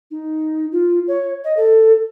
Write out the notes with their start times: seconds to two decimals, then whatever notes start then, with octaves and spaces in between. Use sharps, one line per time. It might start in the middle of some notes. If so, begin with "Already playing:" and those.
0.11 D#4
0.72 F4
1.08 C#5
1.44 D#5
1.57 A4